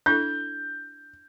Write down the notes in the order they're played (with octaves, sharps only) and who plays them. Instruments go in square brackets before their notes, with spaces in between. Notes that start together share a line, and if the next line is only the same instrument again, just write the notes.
[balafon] D4 E4 A4 [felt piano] G6